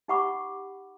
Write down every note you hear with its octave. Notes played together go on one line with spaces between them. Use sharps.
D#4 G4 F#5 B5 C#6 D6